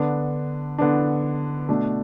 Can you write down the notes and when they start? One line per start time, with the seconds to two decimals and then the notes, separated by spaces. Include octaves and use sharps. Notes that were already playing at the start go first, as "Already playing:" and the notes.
Already playing: D3 B3 D4
0.78 D3 B3 D4
1.68 B2 A3 D4